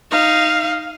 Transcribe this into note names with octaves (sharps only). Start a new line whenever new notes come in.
D#4 F5